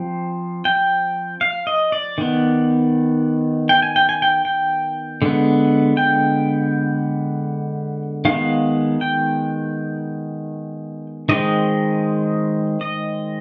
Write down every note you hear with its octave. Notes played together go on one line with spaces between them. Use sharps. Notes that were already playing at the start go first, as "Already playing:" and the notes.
Already playing: F3 C4
G5
F5
D#5
D5
D#3 B3
G5
G#5
G5
G#5
G5
G5
D3 G#3 B3
G5
D#3 G#3 B3 F5
G5
D#3 G#3 C4 D#5
D#5